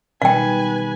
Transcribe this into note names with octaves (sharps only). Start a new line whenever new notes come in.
B2 D#3 G3 B4 F5 G5 G#5